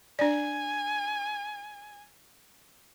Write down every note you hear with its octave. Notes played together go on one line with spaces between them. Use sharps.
D4 D5 G#5